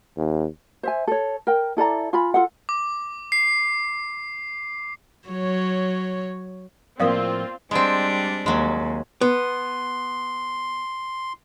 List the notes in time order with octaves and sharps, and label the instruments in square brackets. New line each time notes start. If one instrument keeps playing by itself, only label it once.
[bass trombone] D#2
[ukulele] C5 E5 G#5
A4 C#5
A#4 G5
E4 A4 D5 A#5
F4 G#5 B5
F4 A4 F#5
[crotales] D6
C7
[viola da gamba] F#3 C#5
[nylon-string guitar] A2 F3 A#3 [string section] C4 F4 [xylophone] D5 F5 D#6
[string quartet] G3 D4 [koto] G#3 C4
[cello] D#2 [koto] F#3 G#3
[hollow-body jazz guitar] B3 [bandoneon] C6